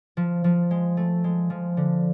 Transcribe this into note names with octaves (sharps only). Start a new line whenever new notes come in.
F3
F3
G#3
A3
G#3
F3
D3